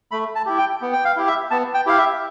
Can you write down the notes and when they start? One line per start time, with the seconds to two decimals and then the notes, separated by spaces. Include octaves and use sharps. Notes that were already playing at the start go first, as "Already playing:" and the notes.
0.11 A3 B5
0.35 A5
0.46 E4 G4
0.58 G5
0.82 B3
0.93 G5
1.05 F5
1.17 E4 G4
1.27 E5
1.51 B3 A5
1.74 G5
1.86 E4 G4 F5
1.98 E5